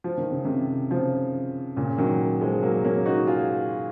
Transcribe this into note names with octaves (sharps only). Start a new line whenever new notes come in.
F3
D#3
C#3
C3 D#3
C#3 F3
A#2 C#3
D#3 F#3
F3 G#3
F#3 A#3
A#3 C#4
D#4 F#4
F4 G#4